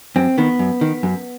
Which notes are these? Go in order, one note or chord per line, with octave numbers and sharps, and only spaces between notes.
F#2 C4
D#3 B3
F#2
D#3
F#2